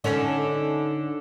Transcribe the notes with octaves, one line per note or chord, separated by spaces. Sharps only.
D3 C#4 D#4